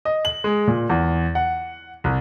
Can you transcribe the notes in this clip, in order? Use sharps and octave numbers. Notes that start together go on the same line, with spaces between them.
D#5
F#7
G#3
A#2
E2
F#5
C2